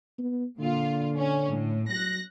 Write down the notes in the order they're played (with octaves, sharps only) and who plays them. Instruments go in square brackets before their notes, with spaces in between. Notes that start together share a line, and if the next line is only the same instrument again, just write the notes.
[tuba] B3
[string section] A#2 F4 [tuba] D3
[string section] C#4
A2
[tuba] F#3 [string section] F#6 A#6